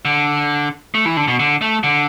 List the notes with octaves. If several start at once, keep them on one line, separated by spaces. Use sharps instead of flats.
D3
A3
E3
D3
B2
D3
A3
D3